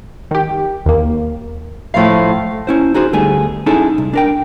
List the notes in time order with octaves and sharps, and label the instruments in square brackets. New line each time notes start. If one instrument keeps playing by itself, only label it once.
[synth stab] D#3 G4
D#2 A#3
[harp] A2 F3 F5
[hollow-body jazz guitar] C#4 E4 C5
D#4 F#4 G#4 C5
D2 G3 A3 B3 G#4
C#4 D#4 E4 G#4 A4
C2
D4 A#4 G5